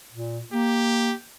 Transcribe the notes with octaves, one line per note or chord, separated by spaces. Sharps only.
A#2
A#3 G4